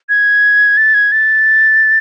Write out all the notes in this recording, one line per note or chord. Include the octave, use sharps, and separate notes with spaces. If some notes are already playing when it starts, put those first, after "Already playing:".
G#6
A6
G#6
A6